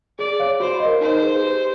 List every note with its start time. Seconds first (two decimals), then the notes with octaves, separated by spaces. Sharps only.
0.19 G#4 D5
0.40 C#5 F5
0.60 F#4 C5
0.80 D#5
0.85 A#4
1.01 D#4 C5
1.22 G#4 B4
1.42 G4